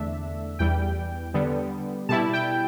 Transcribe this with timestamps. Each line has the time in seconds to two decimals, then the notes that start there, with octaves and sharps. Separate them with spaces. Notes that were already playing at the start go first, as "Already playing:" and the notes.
Already playing: E2 D3 A3 D4 E5
0.59 E2 E3 G3 G5
1.34 D3 G3 B3
2.09 B2 G3 E4 A5
2.33 G5